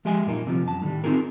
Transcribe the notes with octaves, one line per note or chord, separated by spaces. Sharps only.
F3 G#3 G4 D#5 E5 G#5
G2 A#2 A#3 D#4
D2 C3 E3 F3
F#2 A5
A2 D3 D#3 G3
C4 C#4 D#4 F4 G#4 A#4